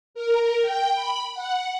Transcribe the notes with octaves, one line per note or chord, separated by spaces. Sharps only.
A#4
G5
B5
F#5